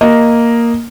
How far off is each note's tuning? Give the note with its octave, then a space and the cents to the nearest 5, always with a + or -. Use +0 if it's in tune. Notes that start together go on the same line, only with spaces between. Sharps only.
A#3 +0 D#5 +0